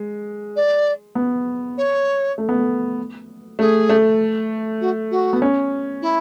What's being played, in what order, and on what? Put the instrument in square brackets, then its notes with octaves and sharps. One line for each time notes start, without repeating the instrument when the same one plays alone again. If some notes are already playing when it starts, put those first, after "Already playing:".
Already playing: [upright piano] G#3
[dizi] D5
[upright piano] B3
[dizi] C#5
[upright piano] A3
B3
A3
[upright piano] A3 [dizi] G#4
[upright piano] A3
[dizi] F#4
F#4
[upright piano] B3
C#4
[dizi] E4